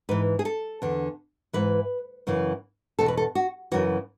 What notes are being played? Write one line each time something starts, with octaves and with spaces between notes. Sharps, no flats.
G#2 E3 B4
G#4
A4
E2 D3
G#2 E3 B4
F#2 C#3 E3
E2 B2 A4
B4
A4
F#4
F#2 C#3 E3 F#4